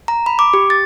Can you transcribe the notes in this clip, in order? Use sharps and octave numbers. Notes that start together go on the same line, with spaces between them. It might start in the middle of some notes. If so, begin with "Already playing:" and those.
A#5
B5
D6
G4
A6